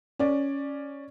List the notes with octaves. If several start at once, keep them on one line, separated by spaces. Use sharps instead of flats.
C#4 D5